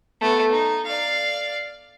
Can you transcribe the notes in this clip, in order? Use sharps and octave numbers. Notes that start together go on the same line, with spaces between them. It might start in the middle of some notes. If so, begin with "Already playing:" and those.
A3 B3
D#4
D5 F5